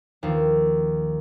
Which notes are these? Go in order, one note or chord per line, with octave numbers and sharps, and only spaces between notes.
D#2 F3